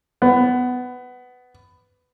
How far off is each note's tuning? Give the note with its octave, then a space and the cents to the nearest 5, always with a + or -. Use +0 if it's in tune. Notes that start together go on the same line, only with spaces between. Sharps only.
B3 +15